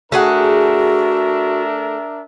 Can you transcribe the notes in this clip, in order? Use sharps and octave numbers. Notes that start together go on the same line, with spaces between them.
A3 D4 F#4 G#4 A#4 E5 F#5